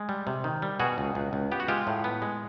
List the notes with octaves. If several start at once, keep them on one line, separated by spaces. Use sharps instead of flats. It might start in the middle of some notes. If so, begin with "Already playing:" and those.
Already playing: G#3
G3
C3
D#3
G3
B2 F#4 G#4
C#2
C#2
C#2
B3 G4
F#4
G#3 F4 G4
A2
B3
G#3